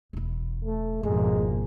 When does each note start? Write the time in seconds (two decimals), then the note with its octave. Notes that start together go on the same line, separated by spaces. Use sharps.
0.13 E1 E4
0.65 A3
1.03 G#1 F2 B2 G#3 A#3